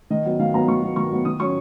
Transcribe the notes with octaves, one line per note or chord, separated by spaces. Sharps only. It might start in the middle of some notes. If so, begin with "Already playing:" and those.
D#3 D#5
F#3 B3
D#3 F5
F#3 B3 A#5
D#3 C#6
F#3 B3
D#3 C#6
F#3 B3
D#3 D#6
F#3 C#4 C#6